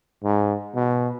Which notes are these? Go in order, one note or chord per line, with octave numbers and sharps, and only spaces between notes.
G#2
B2